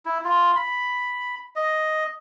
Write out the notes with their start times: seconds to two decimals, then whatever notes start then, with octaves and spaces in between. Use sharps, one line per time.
0.05 E4
0.24 F4
0.56 B5
1.56 D#5